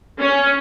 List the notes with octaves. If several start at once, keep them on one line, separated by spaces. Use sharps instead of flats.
C#4